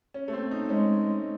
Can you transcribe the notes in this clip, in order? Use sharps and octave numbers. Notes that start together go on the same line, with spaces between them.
C#4
A3
C4
D#4
G#3 C#4